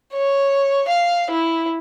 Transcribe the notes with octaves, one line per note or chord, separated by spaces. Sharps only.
C#5
F5
E4